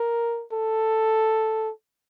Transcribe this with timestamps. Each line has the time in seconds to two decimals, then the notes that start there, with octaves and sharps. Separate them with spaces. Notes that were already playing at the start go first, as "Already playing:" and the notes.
Already playing: A#4
0.52 A4